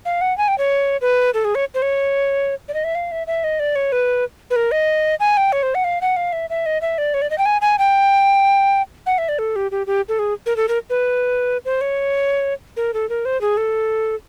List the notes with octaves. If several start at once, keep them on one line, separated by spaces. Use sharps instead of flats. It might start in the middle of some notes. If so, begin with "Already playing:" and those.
F5
F#5
G#5
G5
C#5
B4
A4
G#4
C#5
C5
C#5
D5
D#5
E5
F5
E5
E5
D#5
D5
C#5
B4
B4
A#4
D#5
G#5
G5
C#5
C5
F#5
F5
F#5
F5
E5
E5
D#5
E5
D5
C#5
D5
D#5
G5
G#5
G#5
G5
F#5
E5
D5
A4
G4
G4
G4
A4
G#4
A#4
A4
A#4
B4
C5
C#5
A#4
A4
A#4
C5
G#4
A4